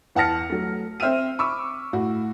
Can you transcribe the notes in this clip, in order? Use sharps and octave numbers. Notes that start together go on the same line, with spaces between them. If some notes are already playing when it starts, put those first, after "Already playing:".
E2 F#5 A5 F6 A#6 C#7
F#3 A3
C4 C5 E5 G5 F6 D#7
B5 C#6 D6 E6
A2 F#4